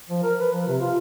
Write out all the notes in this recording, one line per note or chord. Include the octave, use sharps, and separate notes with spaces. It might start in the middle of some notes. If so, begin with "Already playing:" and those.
F3
A#4
B4
F3
C3
F4